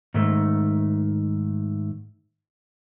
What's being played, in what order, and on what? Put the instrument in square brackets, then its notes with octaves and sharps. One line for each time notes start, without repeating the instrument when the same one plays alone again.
[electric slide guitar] G#2 D#3 A3